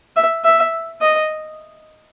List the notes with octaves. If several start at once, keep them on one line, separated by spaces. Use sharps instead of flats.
E5
E5
D#5